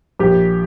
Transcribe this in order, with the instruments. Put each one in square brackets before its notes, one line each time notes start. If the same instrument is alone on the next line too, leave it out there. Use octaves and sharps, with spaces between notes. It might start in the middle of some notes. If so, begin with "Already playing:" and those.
[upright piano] A#1 G4